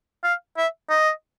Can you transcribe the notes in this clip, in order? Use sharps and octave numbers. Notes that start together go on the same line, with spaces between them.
F5
E5
D#5